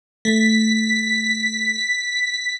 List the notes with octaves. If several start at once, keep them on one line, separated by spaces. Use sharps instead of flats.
A3 B6